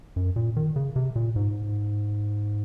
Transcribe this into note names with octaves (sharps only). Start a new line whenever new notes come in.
F#2
A#2
D#3
C#3
C3
A#2
G#2